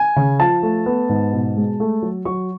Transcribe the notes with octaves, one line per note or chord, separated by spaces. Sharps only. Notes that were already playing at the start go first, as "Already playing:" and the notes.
Already playing: G#5
C#3
F3 A5
A3
B3
G#2
B2
G#3
A3
F#3
F#3 C#6